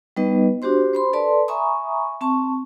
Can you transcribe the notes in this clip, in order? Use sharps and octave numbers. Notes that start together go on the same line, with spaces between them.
G3 B3 D#4 B4 D#5
D4 F#4 G4 C5 C6
C5 B5 C6
A4 B4 D5 A5 C6
E5 G#5 A#5 B5 C#6 D#6
C4 A5 C#6